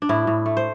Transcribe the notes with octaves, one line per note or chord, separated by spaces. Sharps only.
D4
A2 E4
A2
A3
C5